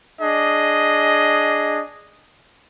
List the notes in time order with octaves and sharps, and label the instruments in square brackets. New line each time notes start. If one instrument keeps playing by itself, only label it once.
[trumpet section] D4 G#4 D#5